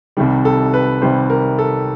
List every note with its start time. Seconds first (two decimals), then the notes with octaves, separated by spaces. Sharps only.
0.17 C2 C3 D#3 G3
0.45 A4
0.74 B4
1.02 C2 C3 D#3 G3 C5
1.30 A#4
1.59 A4